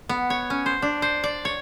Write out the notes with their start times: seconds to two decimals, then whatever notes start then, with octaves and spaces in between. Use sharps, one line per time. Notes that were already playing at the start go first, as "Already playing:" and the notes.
0.09 B3
0.30 C#5
0.50 C#4
0.66 C5
0.82 D4
1.02 C5
1.24 D5
1.45 C#5